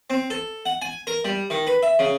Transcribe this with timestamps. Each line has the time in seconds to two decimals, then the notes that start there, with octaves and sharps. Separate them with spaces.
0.10 C4
0.30 A4
0.66 F#5
0.82 G#5
1.07 A#4
1.25 G3
1.50 D#3
1.67 B4
1.83 E5
1.99 C#3